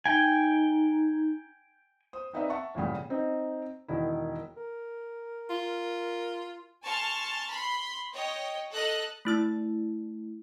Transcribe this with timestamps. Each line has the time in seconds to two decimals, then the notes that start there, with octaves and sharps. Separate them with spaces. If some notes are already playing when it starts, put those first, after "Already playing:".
0.06 D#4 G5 G#5
2.13 C5 D#6
2.33 B3 C4 D#4 B4 D5 E5
2.50 E5 F#5 A5 C#6
2.75 A1 A#2 C#3 G3
3.10 C4 D#4
3.88 E1 D#3 E4
4.57 A#4
5.50 F4
6.83 G#5 A5 C6 C#6 F6
7.49 B5 C6
8.13 C#5 D#5 G5
8.71 A4 D#5 F#6
9.25 A3 E4 E6 A6